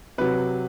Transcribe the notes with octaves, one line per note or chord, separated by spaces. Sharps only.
C3 F#3 B4